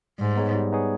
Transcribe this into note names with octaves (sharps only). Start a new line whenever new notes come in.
G#2 G3
B3 D#4 G#4 C#5
G3
B3 D#4 G#4 C#5